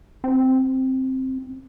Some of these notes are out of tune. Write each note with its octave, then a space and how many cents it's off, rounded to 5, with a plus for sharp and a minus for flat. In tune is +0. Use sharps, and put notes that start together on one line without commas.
C4 +5